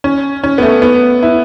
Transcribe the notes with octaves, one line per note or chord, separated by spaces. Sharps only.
C#4
C#4
B3
A3
B3
E4